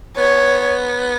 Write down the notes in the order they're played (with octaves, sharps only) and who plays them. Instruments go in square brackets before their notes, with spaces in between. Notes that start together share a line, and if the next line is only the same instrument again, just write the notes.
[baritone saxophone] B3 [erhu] C#5